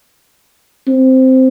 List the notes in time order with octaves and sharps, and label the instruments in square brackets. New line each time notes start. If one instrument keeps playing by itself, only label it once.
[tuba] C4